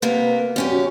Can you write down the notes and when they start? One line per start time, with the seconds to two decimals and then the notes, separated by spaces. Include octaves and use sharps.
0.02 C3 A#3 B3 B4
0.56 F#2 C#4 G4
0.70 F#4